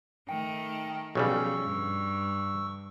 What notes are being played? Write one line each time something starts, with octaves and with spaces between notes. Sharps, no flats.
D#3 A3 G5
B1 C#3 F3 G3 C#4 C#6 E6
G2